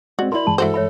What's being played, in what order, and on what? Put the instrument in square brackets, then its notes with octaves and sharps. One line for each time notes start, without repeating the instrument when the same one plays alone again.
[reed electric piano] G#3 C4 [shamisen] F#4 [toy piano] D5 D#5
[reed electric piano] E4 A#4 [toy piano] D5 E5 C6 [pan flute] B5
[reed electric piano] G2 E3 G#3 [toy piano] A5
[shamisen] E4 F#4 C5 [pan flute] A4
[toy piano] C#5 E5 B5